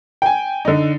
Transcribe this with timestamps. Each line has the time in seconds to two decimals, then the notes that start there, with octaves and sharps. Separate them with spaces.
0.22 G5 G#5
0.65 D3 D#4